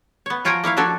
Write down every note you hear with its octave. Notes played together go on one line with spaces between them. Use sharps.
B3 C#5
F3 F4 C#5 G5 G#5 A#5
A#3 E4 C#5 F5
F3 D4 F#4 A4 C#5